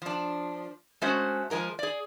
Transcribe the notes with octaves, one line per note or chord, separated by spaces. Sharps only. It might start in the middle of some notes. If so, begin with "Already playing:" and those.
F3 D4
G#3 A3 C#4 F#4 C5
F3 G#3 A#4 A#5
G#4 D5